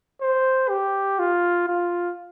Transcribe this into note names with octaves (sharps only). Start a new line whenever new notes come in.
C5
G4
F4
F4